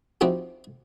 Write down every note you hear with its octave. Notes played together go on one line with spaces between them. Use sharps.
F3 C4 D#4 E4 F#4 G4